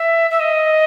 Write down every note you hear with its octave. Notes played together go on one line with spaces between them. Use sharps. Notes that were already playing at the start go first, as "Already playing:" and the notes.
Already playing: E5
E5
D#5